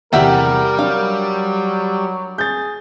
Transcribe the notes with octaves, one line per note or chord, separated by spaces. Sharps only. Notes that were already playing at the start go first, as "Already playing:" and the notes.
E2 C3 G3 A#4 E5 F#5 G5
F#3 D4 A#4 F5
G#4 G6 A6